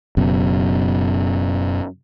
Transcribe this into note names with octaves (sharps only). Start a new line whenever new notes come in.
F#1 F#2 B2